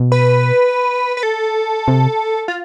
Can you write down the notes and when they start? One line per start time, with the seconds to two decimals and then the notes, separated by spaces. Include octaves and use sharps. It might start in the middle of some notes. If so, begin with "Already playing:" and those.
Already playing: B2
0.12 B4
1.17 B4
1.23 A4
1.88 C3
2.48 F4